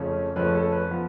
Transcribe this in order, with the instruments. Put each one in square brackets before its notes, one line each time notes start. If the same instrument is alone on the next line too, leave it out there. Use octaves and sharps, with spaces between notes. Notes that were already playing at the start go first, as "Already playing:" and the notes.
Already playing: [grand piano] F2 C#3 F3 A3 C#4
F2 C#3 F3 A3 C#4 B4
A4
B4
F3 B3